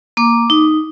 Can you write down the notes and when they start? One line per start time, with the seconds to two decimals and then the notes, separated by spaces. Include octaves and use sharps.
0.17 A#3 D6
0.50 D#4